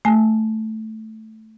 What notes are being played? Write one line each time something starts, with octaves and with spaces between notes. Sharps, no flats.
A3 G#5